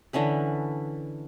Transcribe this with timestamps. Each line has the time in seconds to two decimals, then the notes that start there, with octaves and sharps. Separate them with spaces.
0.13 D3 E3 C#4 B4